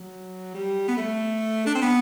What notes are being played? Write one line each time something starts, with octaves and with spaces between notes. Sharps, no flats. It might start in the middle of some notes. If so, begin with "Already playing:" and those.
Already playing: F#3
G3
B3
A3
D4
C4
B3